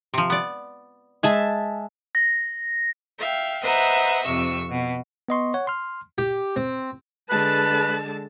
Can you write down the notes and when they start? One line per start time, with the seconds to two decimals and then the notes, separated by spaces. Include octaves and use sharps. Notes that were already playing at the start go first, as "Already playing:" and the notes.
0.14 C3 F3
0.30 B3 D5
1.23 G#3 G#4 E5 A5
2.15 A#6
3.18 E5 F5 G5
3.62 B4 C5 D#5 E5 F#5 A#5
4.23 F2 C3 C#6 E6
4.70 B2
5.29 B3 D#5 C6 C#6
5.54 C#5 F#5
5.67 C6 F6
6.18 G4
6.56 C4
7.29 D3 G#3 B4 A5